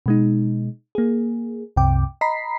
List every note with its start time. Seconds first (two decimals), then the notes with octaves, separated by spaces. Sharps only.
0.06 B2 G#3 D#4
0.95 A#3 G#4
1.76 C2 F#2 C3 G5 D6
2.21 D#5 A#5 B5 B6 C7